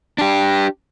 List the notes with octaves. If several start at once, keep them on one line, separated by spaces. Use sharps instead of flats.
D4 G4